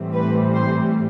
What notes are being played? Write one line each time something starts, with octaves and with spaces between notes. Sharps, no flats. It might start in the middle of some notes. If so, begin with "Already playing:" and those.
Already playing: A2 E3 G3 C4
B4
C5